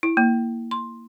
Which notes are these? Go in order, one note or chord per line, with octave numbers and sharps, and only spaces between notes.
E4
A#3
C6